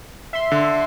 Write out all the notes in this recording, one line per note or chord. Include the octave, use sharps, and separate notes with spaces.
E5 C6
D3